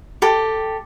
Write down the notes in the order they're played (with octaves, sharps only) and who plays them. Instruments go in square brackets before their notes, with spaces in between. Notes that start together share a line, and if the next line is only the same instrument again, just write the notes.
[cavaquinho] G4 A4